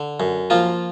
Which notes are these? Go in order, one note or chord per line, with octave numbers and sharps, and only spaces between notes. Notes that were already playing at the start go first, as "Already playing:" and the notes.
Already playing: D3
F#2
F3 A#3 F4